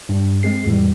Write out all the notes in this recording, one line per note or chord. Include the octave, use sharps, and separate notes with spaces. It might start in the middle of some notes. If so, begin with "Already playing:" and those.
G2
G#3 C4 G#4 C7
F2 A2 E3 G3